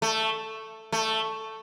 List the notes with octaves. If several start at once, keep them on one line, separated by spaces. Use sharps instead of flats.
A3
A3